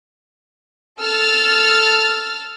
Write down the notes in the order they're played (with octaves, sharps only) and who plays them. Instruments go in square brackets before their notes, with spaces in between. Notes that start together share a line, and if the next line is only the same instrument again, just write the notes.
[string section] A4 E6 F6 A6